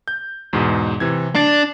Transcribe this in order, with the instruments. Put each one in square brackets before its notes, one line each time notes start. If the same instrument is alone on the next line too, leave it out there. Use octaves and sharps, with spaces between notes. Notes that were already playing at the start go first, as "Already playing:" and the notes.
[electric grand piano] G6
E2 G#2 B2
C3 E3 G#6
[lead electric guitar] D4 [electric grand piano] A6 C7